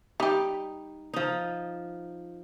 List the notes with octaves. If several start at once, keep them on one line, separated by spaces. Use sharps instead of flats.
G3 D#4 G4
F3 D#4